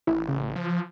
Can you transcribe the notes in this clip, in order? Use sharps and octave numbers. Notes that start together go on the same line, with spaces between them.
A1 E4
C#3
F3